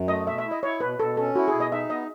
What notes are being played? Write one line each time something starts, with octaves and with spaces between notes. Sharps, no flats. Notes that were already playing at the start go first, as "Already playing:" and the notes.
Already playing: F#2
A3 D#5
B2 E5
E5
E4
D#5
E4 C#5
B2 B4
B2 A4
C#4 A4
E4 F#4
G#4
B2
D#5
D#4 E5
B3 D#5